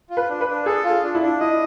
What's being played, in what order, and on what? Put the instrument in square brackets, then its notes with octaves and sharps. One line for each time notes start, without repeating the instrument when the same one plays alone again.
[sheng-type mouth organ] F4
[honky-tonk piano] B4
[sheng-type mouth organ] D4
[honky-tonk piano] B4
[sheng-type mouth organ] D4
[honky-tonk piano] G#4 [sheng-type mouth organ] A4
[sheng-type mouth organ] F4
[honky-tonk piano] G#4
[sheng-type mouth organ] D4
[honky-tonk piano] E4
[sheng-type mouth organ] D4
[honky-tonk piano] E4 [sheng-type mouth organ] D#5